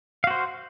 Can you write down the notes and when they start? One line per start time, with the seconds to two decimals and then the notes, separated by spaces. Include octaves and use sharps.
0.24 F5
0.27 F#4
0.31 C5